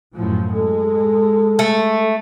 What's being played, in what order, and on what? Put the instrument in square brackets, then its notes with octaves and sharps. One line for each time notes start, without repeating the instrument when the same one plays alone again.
[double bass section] F#2 A2 F3
[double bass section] G#3 [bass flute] A4
[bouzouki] A3